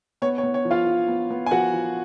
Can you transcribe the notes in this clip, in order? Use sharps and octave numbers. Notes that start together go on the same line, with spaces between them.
B3 C#5
C#5
B3
C#5
F3
F4 F5
F3
B3
B3
G#5
F3 F#4 F#5
F3